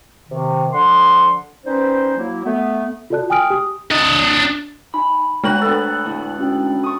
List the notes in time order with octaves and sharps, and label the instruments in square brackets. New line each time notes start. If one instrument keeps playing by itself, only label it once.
[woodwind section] C3 D#3
D3 F3 F#5 C6
G3 C#4 D#4 B4 C5
F#3 A#3 E4
A3 B3
[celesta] F4 F#4 A4 D5 A5 F#6
G5 G#5 D#6 F6 D7
G4 D#6
[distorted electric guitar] D4 D#5
[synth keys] D#4 G#5 [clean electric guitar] B5
[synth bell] G#3 D4 F#7 [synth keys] A3 [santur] A#4 F#5
[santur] B3 A4
[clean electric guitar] D2 A2
[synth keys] C#4 F#4 G5
[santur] C#6 D#6